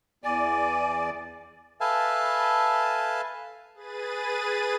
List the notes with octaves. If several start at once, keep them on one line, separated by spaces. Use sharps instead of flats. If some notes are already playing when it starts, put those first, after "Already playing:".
E2 D5 G#5
A4 B4 E5 F5 G#5 A5
G#4 B4 A6 D#7